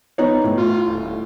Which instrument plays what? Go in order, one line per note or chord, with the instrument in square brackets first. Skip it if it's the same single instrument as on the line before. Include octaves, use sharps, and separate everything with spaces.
[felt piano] B3 D#4 C#5
A2
[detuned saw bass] F4
D#1